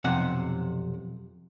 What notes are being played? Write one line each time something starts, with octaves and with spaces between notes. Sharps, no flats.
B1 F2 C3 F#5